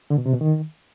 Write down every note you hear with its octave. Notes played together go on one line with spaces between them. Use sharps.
D3
B2
C3
B2
D#3